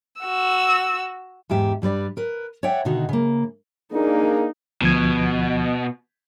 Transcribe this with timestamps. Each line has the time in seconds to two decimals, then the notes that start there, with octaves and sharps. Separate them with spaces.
0.21 F#4 E6
1.50 E2 G#2 G4 E5
1.82 G2 G3 B4 D5
2.17 A#4 B4
2.63 C#5 D5 E5 F#5 G5
2.85 B2 D3 D#3 D#4 F#4
3.09 C#3 A#3
3.93 A#3 D4 D#4 G#4
4.82 D2 B2 F3 G#6